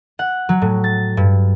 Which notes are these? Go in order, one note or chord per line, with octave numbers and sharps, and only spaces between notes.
F#5
F#3
A2
A6
G2